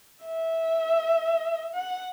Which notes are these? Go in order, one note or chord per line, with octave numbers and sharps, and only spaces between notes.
E5
F#5